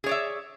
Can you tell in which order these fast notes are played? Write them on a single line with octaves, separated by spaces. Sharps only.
G#4 C#5 D5 E5